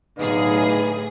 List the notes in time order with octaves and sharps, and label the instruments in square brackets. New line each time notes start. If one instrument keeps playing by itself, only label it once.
[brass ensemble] B1 D#4 F5 [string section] A2 D3 G#4 [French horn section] B4